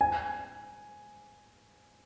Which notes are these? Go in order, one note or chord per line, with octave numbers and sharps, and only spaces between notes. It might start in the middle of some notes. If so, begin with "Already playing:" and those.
G#5